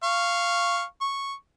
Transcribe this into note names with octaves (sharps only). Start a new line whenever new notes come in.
F5 C#6
C#6